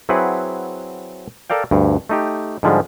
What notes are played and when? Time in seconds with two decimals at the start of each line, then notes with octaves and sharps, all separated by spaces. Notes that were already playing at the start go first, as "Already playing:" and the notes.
0.09 F#3 C4 E4 G#4 B4 F#5
1.50 A4 A#4 D5 F5 G5
1.71 D2 G2
2.09 A3 D#4 G4
2.63 G#2 D3 F3 G3 G#3